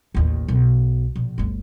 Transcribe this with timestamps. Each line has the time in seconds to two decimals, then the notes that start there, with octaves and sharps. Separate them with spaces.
0.15 A1 D#2
0.48 B1
1.16 A#1
1.38 G1 D2